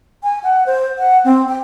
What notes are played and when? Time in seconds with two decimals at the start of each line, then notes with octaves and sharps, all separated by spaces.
0.23 G#5
0.44 F#5
0.66 C5
0.98 F#5
1.25 C4
1.49 G5